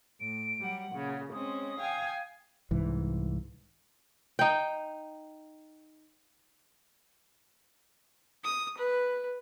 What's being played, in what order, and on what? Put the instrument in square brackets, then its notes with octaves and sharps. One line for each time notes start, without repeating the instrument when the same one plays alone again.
[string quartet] A2 [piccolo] D7
[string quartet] F#3 G3 F#5
[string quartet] A#2 C#3 [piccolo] F#5
[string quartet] G#3 C4 C#4 [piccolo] D#6
[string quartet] F5 G5 G#5
[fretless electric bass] C2 G#2 E3
[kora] D#4 G5
[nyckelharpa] D#6
B4